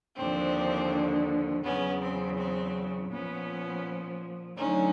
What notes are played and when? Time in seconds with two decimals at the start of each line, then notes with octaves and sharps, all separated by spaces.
0.17 D#2 D3 F3 C4 D4
1.64 E2 C#3 F#3 B3 C#4
2.01 C4
2.38 C4
3.11 A#2 F3 B3 C#4
4.56 D2 D3 F#3 C#4 D#4